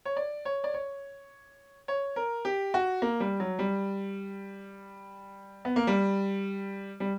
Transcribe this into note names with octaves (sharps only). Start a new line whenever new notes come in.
C#5
D5
C#5
D5
C#5
C#5
A#4
G4
F#4
A#3
G3
F#3
G3
B3
A#3
G3
G3